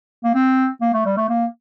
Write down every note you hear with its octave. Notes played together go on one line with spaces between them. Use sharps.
A#3
C4
A#3
A3
G3
A3
A#3